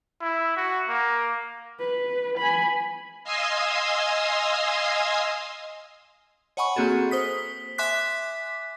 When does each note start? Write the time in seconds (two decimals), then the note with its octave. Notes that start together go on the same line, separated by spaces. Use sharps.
0.21 E4
0.56 F#4
0.88 A#3
1.80 B4
2.38 G#5 B5
3.24 D#5 F5 G#5 C6 D#6 E6
6.57 C#5 D#5 F#5 G#5 B5 C#6
6.76 A#3 C4 F#4 G#4 A4
7.11 C5 D#6 B6
7.78 E5 G#5 C6 D6 F#6 B6